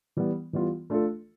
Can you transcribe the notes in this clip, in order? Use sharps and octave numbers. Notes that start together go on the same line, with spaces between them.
E3 G3 B3
E3 G3 B3 F4
A3 D4 F4 A4